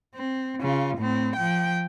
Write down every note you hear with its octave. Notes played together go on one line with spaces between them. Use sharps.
C4
C#3 F4
A2 C4
F3 G5